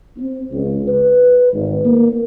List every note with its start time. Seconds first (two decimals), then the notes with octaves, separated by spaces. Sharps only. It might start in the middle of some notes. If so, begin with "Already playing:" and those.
0.18 C4
0.52 C#2
0.88 B4
1.53 G#1
1.85 A#3